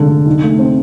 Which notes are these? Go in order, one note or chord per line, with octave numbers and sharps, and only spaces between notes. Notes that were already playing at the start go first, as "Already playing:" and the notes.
Already playing: F1 D3 G#3
F1
B1
A3
C4